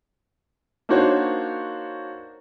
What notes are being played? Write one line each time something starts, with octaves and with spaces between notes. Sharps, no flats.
A#3 D4 D#4 F#4 C5 C#5